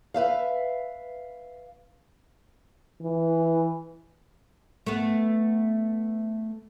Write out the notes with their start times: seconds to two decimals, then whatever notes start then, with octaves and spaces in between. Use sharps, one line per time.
0.14 B4 C5 E5 F5
3.02 E3
4.86 A3 B3